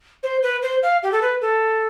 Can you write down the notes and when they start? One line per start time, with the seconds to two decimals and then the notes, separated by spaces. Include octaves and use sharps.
0.23 C5
0.43 B4
0.62 C5
0.83 F5
1.03 G4
1.12 A4
1.22 B4
1.41 A4